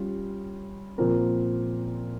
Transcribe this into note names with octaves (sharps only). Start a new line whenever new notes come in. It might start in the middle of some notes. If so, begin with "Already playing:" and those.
Already playing: G3 C#4 F4
A#2 F3 C4 F4 A#4